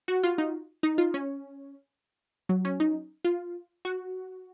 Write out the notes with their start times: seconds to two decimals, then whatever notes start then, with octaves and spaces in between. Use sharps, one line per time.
0.08 F#4
0.23 F4
0.38 D#4
0.83 D#4
0.98 F4
1.14 C#4
2.49 F#3
2.65 C#4
2.80 D#4
3.24 F4
3.85 F#4